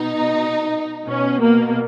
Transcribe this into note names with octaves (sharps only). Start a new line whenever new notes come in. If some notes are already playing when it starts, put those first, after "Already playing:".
Already playing: B2 D#4
B2 C#4
A#3